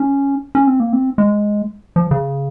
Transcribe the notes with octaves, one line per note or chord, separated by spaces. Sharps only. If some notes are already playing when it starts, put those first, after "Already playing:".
Already playing: C#4
C#4
C4
A#3
C4
G#3
F3
C#3